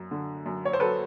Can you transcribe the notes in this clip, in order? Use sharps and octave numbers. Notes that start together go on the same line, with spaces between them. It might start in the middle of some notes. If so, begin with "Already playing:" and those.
Already playing: F#2
D3
F#2
C#5
C5
F#3 A4 B4